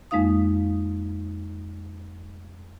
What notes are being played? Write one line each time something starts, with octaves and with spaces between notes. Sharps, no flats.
F2 G#3 A#3 D#4 F5 D#6